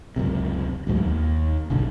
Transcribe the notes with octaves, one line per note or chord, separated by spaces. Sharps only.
C#2 F#2 C3
A1 D2 G#2 F#3
D#2
F#1 B1 D3